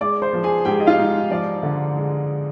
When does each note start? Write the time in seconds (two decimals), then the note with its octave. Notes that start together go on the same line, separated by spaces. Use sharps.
0.01 G#3 D5 D6
0.22 C5 C6
0.33 F3
0.43 G#4 G#5
0.65 G#2 G4 G5
0.80 D#5
0.87 F4 F5
0.98 G#2
1.30 F3 D5
1.63 D3
1.96 G#3